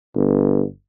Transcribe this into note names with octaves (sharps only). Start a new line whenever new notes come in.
G1